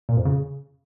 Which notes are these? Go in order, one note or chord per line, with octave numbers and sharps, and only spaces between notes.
A#2
F2
C#3